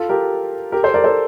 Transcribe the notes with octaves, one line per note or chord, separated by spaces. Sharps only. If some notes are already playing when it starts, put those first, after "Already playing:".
Already playing: F4 A4
G4 A#4
G4 A#4
A4 C5
A#4 D5
A4 C5